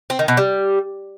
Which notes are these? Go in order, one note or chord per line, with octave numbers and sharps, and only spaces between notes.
C4
D#3
B2
G3